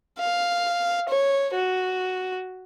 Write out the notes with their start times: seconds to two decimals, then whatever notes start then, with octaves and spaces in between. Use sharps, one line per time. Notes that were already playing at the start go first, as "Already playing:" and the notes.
0.19 F5
1.09 C#5
1.54 F#4